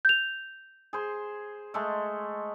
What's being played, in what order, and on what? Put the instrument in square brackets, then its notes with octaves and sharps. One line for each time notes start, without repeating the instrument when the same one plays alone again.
[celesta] G6 F7
[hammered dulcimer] G#4 C5
G#3 A3